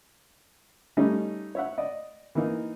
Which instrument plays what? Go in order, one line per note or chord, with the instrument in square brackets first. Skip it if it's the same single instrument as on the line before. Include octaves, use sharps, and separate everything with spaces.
[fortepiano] G3 A3 C#4 D#4
C#5 E5 F#5
D5 D#5
E3 A#3 D#4